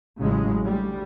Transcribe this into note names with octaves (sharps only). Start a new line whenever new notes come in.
A1 C#3 F#3 G#3
D2 G3